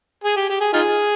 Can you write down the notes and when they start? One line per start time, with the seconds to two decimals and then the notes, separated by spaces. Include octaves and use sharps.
0.24 G#4
0.36 G4
0.49 G4
0.61 G#4
0.73 D#4 F4 G#4